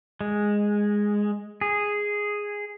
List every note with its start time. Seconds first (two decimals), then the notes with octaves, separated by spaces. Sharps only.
0.21 G#3
1.61 G#4